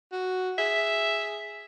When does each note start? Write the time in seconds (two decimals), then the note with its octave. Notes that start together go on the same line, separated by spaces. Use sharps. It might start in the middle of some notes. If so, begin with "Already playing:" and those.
0.12 F#4
0.58 G#4 E5